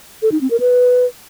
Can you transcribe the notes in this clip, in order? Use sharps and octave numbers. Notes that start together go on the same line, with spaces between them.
A4
D#4
C4
A#4
B4